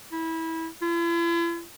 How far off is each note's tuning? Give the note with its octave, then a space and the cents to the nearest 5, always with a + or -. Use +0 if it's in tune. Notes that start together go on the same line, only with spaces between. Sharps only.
E4 -20
E4 +45